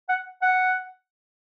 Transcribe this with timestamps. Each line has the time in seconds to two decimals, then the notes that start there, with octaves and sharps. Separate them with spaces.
0.09 F#5
0.42 F#5